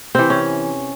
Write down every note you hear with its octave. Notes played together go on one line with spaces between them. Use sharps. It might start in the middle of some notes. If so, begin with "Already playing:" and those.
C3 E3 C4
C#4